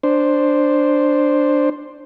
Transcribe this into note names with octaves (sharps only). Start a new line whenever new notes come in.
D4 C5